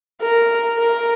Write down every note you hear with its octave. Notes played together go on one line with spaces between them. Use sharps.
A#4
A#4